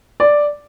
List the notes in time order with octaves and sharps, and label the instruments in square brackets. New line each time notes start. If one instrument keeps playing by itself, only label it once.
[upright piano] D5